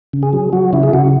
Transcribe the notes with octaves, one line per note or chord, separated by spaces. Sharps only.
C#3
G#4
F#3
F#3 F#4
C#3 E4
G#4
C#3 F#4